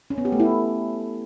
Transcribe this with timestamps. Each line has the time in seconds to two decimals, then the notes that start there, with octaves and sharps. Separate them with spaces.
0.10 C#4
0.18 B3
0.25 G4
0.32 A3
0.40 E4